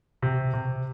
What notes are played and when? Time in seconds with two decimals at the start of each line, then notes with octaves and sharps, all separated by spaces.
0.22 C3
0.54 C3